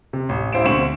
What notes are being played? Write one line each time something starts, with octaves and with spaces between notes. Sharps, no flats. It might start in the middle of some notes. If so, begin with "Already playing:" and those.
C3
A1
A1 E4 C5 F5 D7 E7
D2 B2 C4 C#6 E7 F#7